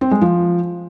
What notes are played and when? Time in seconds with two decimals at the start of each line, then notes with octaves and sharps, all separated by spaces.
0.01 C4
0.11 G#3
0.22 F3